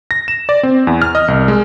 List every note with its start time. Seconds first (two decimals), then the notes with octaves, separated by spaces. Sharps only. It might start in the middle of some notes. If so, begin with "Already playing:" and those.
0.11 A#6
0.28 E7
0.49 D5
0.63 C4
0.87 E2
1.02 F6
1.15 D#5
1.28 C2
1.48 G#3